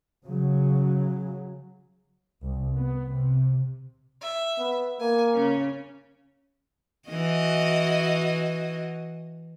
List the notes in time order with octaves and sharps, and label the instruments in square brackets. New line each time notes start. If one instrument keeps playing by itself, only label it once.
[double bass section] C#3 F#3
C2
B3
C3
[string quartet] E5
[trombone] B3
[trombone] A#3 [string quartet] G#5
[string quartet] C#3 C#4
[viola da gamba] E3 F#4 D#5